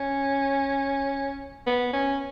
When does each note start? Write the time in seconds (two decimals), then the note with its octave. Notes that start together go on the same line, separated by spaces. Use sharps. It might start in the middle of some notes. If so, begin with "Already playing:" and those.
Already playing: C#4
1.67 B3
1.93 C#4